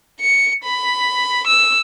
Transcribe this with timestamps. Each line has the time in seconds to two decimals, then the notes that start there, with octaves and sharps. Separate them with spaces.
0.21 C#7
0.64 B5
1.47 E6